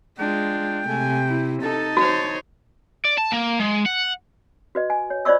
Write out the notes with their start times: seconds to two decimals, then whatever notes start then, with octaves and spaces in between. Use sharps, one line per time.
0.19 G#3 D4 F4 G5
0.87 C3 A3 G#5
1.27 E4
1.63 D#4 A4 A5
1.97 F#4 C5 C#5
3.05 D5
3.18 A5
3.33 A#3
3.60 G#3
3.86 F#5
4.75 F#4 B4 D#5
4.90 G#5
5.10 C#5
5.25 F4 C5 D5 D#5 C#6 E6